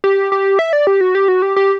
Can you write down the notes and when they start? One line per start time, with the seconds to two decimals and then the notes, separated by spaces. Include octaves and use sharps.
0.04 G4
0.32 G4
0.59 E5
0.73 D5
0.87 G4
1.01 F#4
1.15 G4
1.28 F#4
1.42 G4
1.56 G4